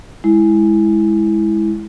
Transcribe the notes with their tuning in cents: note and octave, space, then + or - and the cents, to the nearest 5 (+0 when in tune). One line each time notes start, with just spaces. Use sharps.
G#3 +0 E4 -10